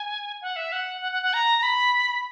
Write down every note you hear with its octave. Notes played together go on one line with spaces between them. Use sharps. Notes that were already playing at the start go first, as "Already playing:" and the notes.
Already playing: G#5
F#5
E5
F#5
F#5
F#5
F#5
A#5
A#5
B5